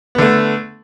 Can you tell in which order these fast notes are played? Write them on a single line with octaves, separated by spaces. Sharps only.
B3 D3 A3